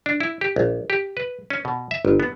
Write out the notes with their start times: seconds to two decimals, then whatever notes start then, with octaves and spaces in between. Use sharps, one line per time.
0.06 D4
0.20 E4
0.41 G4
0.56 A#1
0.90 G4
1.17 B4
1.50 C#4
1.65 B2
1.91 E5
2.05 G1
2.20 B3